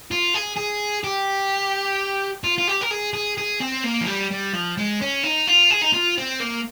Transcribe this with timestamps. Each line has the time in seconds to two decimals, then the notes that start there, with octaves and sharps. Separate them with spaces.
0.11 F4
0.34 G#4
0.57 G#4
1.04 G4
2.44 F4
2.58 F4
2.68 G4
2.81 A#4
2.91 G#4
3.13 G#4
3.37 G#4
3.60 C4
3.84 A#3
4.01 F3
4.07 G3
4.31 G3
4.53 F3
4.77 G#3
5.01 C#4
5.23 D#4
5.47 F4
5.71 G#4
5.82 D#4
5.93 F4
6.17 C4
6.40 A#3